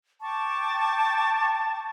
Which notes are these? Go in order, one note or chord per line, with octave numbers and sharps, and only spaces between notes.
G5 A5 C#6 D6